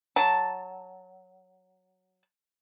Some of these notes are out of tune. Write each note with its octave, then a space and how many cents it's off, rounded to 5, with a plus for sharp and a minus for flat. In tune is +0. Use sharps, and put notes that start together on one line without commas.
F#3 +0 A5 +0